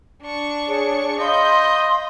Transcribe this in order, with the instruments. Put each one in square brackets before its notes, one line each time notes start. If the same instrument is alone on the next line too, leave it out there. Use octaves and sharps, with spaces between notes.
[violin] D4 C#6
[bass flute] G#4 [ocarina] C#5
[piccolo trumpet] D#5 [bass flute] F5 [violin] B5 G6 [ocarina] C6